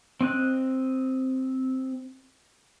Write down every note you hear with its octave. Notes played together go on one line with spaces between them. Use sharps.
C4 D#5 F#6